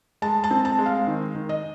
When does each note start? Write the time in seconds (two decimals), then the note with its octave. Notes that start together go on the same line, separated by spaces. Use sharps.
0.22 G#3 A5
0.44 A5
0.51 C4
0.65 A5
0.79 G#3
0.86 F5
1.07 D#3
1.35 D#3
1.49 D#5